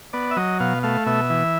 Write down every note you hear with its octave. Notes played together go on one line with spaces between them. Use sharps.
B3 D5
E5
F#3 D#5
B2 F5
A3 F5
B2 E5
E3